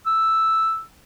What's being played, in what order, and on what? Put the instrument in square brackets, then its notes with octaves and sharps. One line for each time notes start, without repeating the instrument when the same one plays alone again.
[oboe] E6